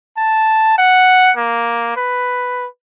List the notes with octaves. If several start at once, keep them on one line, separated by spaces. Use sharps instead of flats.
A5
F#5
A#3
B4